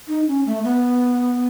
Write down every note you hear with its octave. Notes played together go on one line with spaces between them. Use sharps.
D#4
C#4
A3
B3